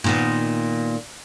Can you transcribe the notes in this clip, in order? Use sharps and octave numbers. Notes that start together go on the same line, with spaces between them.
A#2 D#3 B3